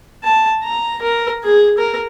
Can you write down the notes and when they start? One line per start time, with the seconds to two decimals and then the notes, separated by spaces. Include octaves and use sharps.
0.24 A5
0.64 A#5
1.02 A#4
1.44 G#4
1.78 A#4